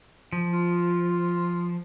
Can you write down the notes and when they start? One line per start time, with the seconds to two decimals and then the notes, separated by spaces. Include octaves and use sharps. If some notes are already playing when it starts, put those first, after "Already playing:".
0.32 F3
0.53 F4